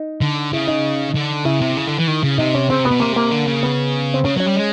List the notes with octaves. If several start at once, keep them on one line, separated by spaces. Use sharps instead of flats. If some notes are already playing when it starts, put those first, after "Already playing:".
Already playing: D#4
D3
C#3 E4
D#4
D3
C#3 E4
C3
C#3
D3
E3
D#3
C#3
C3 D#4
C#4
C#3 C4
C3
B3
B2
C3 A#3
A#3
D3
C#3
B3
C4
C#3 C#4
F#3 C#4
G3
G#3